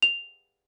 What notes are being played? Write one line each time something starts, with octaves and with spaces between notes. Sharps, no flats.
F7